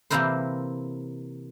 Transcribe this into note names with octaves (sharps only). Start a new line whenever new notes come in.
C3 E3 A#3 E4 A#4 C5